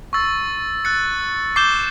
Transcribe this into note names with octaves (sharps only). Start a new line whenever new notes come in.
C#6 E6 A6
F#6 A6 C#7
D6 G6 C7 E7 G7